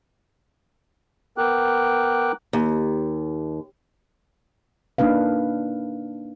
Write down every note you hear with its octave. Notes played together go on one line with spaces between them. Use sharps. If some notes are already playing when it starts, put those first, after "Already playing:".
B3 A#4 G5 D6 F#6
D#2
A#3 D4 D#4 B4 F5